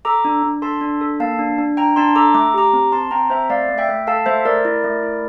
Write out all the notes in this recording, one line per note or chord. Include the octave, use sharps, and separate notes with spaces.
A4 A#5 D6
D4
D4
A4 A5 C6
D4
A4
A#3 F5 A5
D4
D4
D4 G5 A#5
D4 A5 C6
A4 A#5 D6
A3 D6
G4 A#5 D6
C4
C4 A5 C6
C4 G5 A#5
C4 C5 E5
A3 D5 F5
A3
E5 G5
A3
A4 F5 A5
A3 C5 E5
A3 A#4 D5
E4
A3
E4